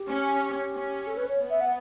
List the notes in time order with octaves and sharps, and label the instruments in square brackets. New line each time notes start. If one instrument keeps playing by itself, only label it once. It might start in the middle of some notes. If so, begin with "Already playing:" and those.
Already playing: [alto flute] G4
[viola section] C#4
C#4
[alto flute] A4
B4
C#5
[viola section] B3
[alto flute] E5
F#5